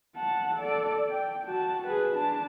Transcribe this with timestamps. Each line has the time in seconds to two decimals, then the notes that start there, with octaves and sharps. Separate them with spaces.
0.15 F#5 A5
0.55 A4 D5
1.09 G5
1.45 F#4 A5
1.87 G#4 B4
2.16 D4 A5